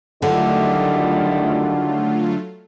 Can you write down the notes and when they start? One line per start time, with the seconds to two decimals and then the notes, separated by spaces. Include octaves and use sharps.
0.22 D3 D#3 F#3 G3 A3 E4 F4 F#5